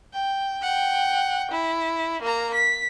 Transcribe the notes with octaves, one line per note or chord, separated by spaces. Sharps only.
G5
F#5 G5
E4
A#3 A#5
B6